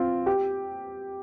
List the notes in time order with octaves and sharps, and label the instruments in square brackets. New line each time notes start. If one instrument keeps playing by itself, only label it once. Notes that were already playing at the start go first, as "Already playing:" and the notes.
Already playing: [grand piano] C4 F4
G4